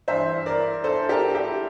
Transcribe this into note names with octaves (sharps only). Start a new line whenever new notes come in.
G2 E3 C5 E5
A#4 D5
A4 C5
G4 A#4
E4 G4